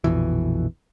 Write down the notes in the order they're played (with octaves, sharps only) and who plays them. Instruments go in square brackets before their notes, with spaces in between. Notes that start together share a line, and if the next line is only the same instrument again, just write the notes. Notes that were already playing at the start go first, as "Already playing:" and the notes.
[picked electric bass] A#1 F2 B2 E3